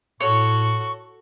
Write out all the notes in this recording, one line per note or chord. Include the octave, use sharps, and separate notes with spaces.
A2 F#4 A4 C#5 C#6